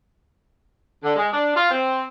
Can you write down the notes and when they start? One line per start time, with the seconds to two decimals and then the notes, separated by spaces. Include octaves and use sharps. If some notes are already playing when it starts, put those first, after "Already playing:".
1.03 D3
1.16 G#3
1.33 D4
1.56 F4
1.71 C4